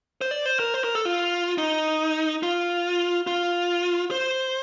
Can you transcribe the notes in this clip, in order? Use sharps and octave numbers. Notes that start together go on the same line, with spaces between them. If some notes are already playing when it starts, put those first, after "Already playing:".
C5
D5
C5
A#4
C5
A#4
A4
F4
D#4
F4
F4
C5